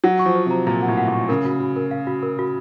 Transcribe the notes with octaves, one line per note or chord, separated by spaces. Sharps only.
F#3 F#5
C#6
F3
C5
C3 A#5
A#2 A#5
F#5
A2
F#5
A#2
C#6
C#3 A#4
F#4
F#4
A#4
F5
F#4
A#4
F#4